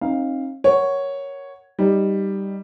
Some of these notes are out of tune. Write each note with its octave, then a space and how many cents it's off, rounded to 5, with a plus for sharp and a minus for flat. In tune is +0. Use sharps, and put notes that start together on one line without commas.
C4 +40 D#4 +0 F5 +0
A#4 +10 C#5 +0 F#5 +5
G3 +0 D#4 -5